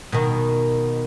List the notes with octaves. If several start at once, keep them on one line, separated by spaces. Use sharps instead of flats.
B2 D#3